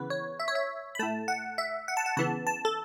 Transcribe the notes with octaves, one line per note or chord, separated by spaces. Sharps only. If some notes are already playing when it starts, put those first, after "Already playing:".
Already playing: C#3 E3 B3 B4
C#5
E5
C#5
E5
B5
A2 A3 A5
F#5
E5
F#5
A5
F#5
C#3 E3 B3 A5
A5
A4